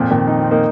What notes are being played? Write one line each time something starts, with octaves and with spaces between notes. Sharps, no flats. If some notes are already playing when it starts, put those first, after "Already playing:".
Already playing: F2 A#2
A#2 D#3
D#4
C4
A#3 D#4